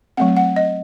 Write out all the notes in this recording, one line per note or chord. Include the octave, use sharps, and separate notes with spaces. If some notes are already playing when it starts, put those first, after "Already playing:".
F#3 A3 C4 F#5
F#5
D#5